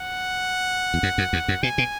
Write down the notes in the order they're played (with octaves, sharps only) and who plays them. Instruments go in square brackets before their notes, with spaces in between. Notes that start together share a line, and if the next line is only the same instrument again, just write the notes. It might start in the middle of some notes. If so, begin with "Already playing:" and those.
Already playing: [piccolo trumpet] F#5
[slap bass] E2
F#2
F#2
E2
F#2
[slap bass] B2 [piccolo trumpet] G#5
[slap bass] B2